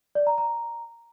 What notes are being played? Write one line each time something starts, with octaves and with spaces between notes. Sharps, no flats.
D5
A#5
A#5